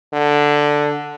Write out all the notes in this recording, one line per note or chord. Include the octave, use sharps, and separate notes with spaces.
D3